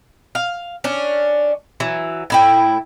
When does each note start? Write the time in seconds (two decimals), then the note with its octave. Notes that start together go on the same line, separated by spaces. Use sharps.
0.35 F5
0.84 C#4 D4
1.80 E3 F#3
2.30 A2 E4 G5